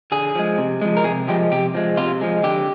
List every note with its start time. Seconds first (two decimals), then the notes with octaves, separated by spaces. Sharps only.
0.12 D3 G#4
0.35 F3 G#3
0.58 C3
0.81 F3 G#3
0.97 A#4
1.04 C3 G#4
1.28 F3 G#3 G4
1.52 C3 G4
1.75 F3 G#3
1.97 C3 F4
2.21 F3 G#3
2.43 D3 G4